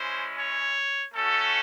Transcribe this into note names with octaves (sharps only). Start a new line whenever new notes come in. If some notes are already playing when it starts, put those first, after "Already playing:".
Already playing: G#3 C#4 E4 C5
C#5
A3 C#4 F#4 A4